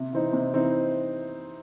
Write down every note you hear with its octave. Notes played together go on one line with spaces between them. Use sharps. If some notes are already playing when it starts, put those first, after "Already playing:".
Already playing: C3
E3 C4 D#4
C3
E3 C4 D#4